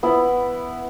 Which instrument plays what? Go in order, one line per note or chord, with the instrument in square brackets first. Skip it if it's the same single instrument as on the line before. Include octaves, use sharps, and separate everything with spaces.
[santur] B3 E4